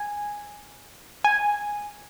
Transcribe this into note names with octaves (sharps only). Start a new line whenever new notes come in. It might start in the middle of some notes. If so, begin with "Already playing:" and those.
Already playing: G#5
G#5